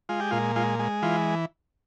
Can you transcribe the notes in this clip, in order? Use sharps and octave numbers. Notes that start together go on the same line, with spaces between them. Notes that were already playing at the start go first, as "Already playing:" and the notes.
G#3 F4
G4
A#2 F4
G#3 F4
G#3
E3 F4